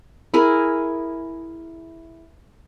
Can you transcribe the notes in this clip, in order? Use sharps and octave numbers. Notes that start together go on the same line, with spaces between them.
E4 G#4 A#4